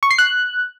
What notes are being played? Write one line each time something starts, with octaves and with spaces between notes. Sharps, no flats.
C#6
C7
F#6